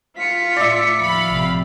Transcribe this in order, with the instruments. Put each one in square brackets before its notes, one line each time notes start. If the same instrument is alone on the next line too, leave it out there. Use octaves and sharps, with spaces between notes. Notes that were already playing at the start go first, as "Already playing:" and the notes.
[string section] F4 [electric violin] B6 C#7
[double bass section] A2 [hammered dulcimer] D5 E5
[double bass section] D#2 F3 [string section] F5 B5
[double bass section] A1 C3 F3